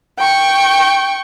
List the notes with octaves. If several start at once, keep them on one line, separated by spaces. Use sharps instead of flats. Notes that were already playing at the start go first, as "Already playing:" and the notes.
G5 C#6